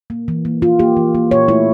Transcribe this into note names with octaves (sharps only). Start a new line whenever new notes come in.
A#3
E3
A#3
E3 F4
A#3 G4
E3
A#3
A#2 C#5
A3 E4